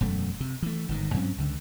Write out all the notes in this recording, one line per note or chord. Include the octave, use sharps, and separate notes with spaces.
E1 F#2 A3
C3
E3 A3
G1 G#2 D#3
G2 F#3 C4 C#4
C#2 D3